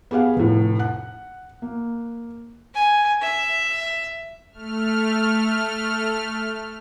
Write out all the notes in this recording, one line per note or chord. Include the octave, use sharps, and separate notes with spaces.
B3 G4 G#4 F5 F#5
F1 A2
F#5 F#6
A#3
G#5
E5
A3 F6